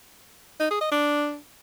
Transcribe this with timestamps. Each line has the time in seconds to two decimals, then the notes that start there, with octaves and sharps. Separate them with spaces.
0.60 D#4
0.71 G#4
0.81 D#5
0.92 D4